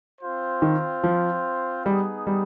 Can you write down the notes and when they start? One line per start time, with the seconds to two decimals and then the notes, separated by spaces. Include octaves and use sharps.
0.21 C4 F4 C5
0.62 D#3
1.04 F3
1.86 G3 B3 D#4 G#4
2.27 G3